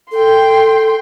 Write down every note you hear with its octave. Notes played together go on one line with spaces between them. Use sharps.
A4 G5 C6